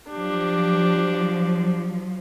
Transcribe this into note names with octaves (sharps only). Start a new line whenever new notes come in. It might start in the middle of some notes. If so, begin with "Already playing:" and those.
F3 F#3 D4 G4